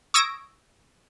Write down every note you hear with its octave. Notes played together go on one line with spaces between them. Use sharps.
C#6 D#6 E6 G#6 A#6 D7